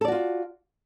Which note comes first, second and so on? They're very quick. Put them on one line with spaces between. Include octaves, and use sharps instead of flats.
A4 D5 F#4 F4